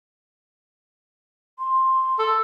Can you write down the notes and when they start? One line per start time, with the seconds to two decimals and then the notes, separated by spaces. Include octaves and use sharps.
1.59 C6
2.19 A4